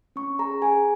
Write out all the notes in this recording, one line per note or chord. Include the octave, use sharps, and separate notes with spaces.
C#4 C#6
G#4 A#5
G#4 G#5